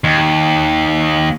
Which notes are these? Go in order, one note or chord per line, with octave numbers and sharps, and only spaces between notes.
D#2